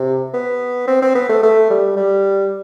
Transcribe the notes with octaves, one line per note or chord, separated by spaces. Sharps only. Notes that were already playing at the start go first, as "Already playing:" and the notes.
Already playing: C3
B3
C4
C4
B3
A3
A3
G3
G3